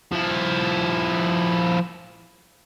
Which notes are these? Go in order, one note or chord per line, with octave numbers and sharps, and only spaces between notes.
F3 E4